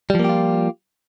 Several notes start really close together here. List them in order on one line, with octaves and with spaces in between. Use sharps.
G3 F3 A#3 G4 F4